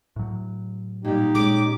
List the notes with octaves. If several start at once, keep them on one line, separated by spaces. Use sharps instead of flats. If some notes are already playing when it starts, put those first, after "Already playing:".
A2 F#3
A#2 G3 D#4 G4
A#2 G#3 C#4 D6